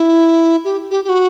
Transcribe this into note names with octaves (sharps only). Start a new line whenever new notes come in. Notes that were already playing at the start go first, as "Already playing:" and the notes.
Already playing: E4
G4
G4
G4
F#4